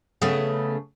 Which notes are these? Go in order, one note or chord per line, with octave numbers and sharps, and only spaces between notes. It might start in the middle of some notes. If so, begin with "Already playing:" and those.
C#3 A3 B3